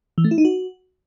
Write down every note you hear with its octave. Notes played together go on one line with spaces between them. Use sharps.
E3
A3
E4
D#4
F#4